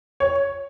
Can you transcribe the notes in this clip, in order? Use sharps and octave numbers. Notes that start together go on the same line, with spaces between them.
C#5